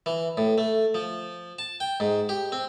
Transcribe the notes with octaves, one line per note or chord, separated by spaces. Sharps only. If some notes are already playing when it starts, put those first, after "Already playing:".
E3
A2
A3
F3
A5
G5
G#2
G4
C4